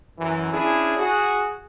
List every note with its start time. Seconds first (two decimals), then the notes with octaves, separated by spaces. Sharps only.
0.19 F#2 E3
0.53 C#4 D4 E4 G#4
0.99 F#4 G#4